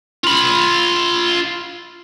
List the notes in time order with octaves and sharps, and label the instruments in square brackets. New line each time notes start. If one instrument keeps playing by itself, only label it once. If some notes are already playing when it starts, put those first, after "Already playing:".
[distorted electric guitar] F4 B5